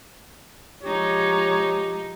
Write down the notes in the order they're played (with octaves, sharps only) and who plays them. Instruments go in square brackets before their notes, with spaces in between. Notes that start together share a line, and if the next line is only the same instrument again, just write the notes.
[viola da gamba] F3 G#3 D#4 [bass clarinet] G4 [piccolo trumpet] C#5